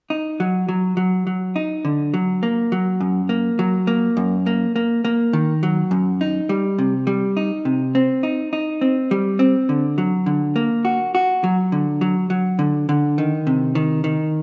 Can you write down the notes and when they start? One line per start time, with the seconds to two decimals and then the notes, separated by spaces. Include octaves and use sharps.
0.10 D#4
0.40 F#3
0.69 F#3
0.97 F#3
1.27 F#3
1.56 D#4
1.85 D3
2.14 F#3
2.43 A#3
2.72 F#3
3.00 F#2
3.29 A#3
3.59 F#3
3.87 A#3
4.17 F#2
4.47 A#3
4.76 A#3
5.05 A#3
5.33 D#3
5.63 F#3
5.91 F#2
6.21 D#4
6.49 G3
6.78 C3
7.07 G3
7.37 D#4
7.65 C3
7.95 C4
8.23 D#4
8.53 D#4
8.81 C4
9.11 G3
9.39 C4
9.69 D3
9.98 F#3
10.26 D3
10.56 A#3
10.85 F#4
11.15 F#4
11.44 F#3
11.72 D3
12.01 F#3
12.30 F#3
12.59 D3
12.89 D3
13.18 D#3
13.47 C3
13.75 D#3
14.04 D#3